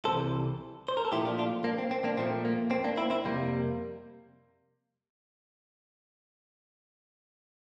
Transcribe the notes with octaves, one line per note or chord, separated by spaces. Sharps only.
C2 C3 E3 A4 C5
C5
A#4
A4
A#2 F3 A3 E4 G4
D4 F4
D4 F4
A#3 D4
C4
C4
A#3 D4
A#2 F3 A3 C4
A#3
C4
A#3 D4
C4 E4
C4 E4
F2 C3 G3 A#3